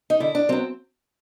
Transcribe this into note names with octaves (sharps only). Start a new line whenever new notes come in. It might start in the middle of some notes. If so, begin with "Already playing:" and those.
D#4
D3 E4
D4
F#3 B3 C4